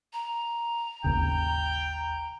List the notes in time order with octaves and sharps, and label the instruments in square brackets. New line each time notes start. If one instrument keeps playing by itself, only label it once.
[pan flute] A#5
[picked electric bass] G#1 D#2 C#3 [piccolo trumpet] G5